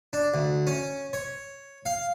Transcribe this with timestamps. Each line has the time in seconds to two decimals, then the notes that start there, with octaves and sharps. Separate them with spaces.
0.13 D4
0.34 D2
0.67 C#4
1.13 C#5
1.86 F5